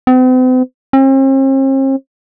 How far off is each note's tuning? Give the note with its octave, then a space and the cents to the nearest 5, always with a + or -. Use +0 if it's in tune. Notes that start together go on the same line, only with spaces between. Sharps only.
C4 -45
C4 +45